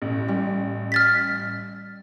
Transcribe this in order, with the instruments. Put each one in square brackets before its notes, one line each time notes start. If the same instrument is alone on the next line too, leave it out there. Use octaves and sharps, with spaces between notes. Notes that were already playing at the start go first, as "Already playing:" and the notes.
[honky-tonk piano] A1
[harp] G3
[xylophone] F6 A6 B6